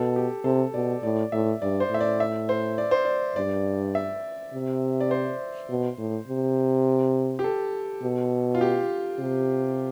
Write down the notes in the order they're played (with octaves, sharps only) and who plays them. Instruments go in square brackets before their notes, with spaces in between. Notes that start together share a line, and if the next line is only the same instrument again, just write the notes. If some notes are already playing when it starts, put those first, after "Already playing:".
Already playing: [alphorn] B2 [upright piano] A4
[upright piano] G4
[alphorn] C3 [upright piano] A4
[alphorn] B2 [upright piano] D5
[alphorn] A2 [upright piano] D5
[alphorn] A2 [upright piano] E5
[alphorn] G2 [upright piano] D5
[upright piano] C5
[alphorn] A2 [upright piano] E5
[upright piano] D5
E5
C5
D5
C5
D5
[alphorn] G2 [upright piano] D5
[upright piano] E5
[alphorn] C3
[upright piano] D5
C5
[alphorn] B2
A2
C3
[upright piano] G4
A4
[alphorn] B2
[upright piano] F4
G4
[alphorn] C3